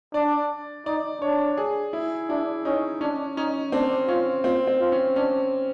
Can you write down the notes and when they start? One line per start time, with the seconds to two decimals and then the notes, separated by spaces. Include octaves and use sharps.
0.14 D4 D5
0.86 D#4 D5
1.22 D4 C#5
1.57 G#4
1.93 E4
2.29 D4 E4
2.65 C#4 D#4
3.01 C#4 D4
3.37 C#4 D#4
3.72 C4 D4
4.08 C#4 F4
4.44 C4 F4
4.67 C4
4.80 F4
4.92 C#4
5.16 C#4 D4